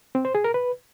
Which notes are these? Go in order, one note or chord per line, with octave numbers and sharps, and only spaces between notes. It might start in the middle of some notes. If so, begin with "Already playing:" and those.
C4
C5
G#4
A#4
B4